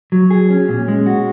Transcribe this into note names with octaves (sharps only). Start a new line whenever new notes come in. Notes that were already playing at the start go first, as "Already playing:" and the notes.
F#3
G#4
C#4
A#2
G#3
F#4